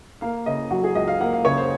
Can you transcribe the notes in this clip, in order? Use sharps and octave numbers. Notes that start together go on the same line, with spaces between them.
A#3 F5
C#3 D#5
F#3 F#4
G#4
C#2 D#5
F5
A#3 F#5
F5
C#3 C#5
C5